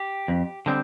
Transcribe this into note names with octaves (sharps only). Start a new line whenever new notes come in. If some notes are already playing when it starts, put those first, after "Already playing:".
Already playing: G4
F2
D3 G3 C4